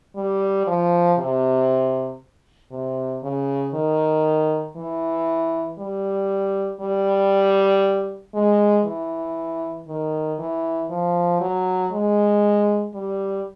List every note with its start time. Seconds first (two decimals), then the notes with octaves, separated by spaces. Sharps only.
0.16 G3
0.67 F3
1.18 C3
2.71 C3
3.23 C#3
3.74 D#3
4.76 E3
5.78 G3
6.81 G3
8.34 G#3
8.85 E3
9.88 D#3
10.39 E3
10.90 F3
11.41 F#3
11.92 G#3
12.95 G3